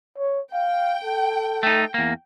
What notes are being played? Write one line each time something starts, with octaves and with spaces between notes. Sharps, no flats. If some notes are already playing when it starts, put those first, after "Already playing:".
C#5
F5 G5
A4
A3 D#4
E2 A#3